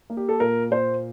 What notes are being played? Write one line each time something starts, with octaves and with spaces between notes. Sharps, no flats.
A#3
G4
A4
A#2 A#4
A#2 C5